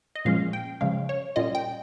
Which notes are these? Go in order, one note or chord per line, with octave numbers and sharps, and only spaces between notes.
D#5
A#2 F3 G#3 C#4 F5
G5
C#3 F3 G#3 C#4 F5
C#5
A#2 G3 C#4 F4 D#5
G5